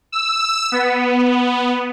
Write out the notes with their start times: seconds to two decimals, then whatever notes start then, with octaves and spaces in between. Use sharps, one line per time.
0.12 E6
0.72 B3